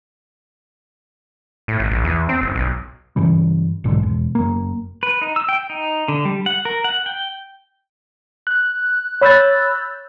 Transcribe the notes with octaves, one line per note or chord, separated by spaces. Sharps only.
A2
G#1
A#1
E2
C4
F#1
B1
G2 C#3 E3 G3
B1 G#2 D3
E1
F#1 A#3
B4
D#4
E6
G5
D#4
D3
G3
F#5
A#4
F#5
G5
F#6
C#5 B5 E6 F#6 G6 A6